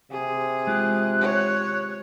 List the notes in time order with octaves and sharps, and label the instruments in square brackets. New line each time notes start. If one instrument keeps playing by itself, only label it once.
[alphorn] C3 [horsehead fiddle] G#4
[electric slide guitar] G#3 F4 G4 [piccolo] F#6
[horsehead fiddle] C#5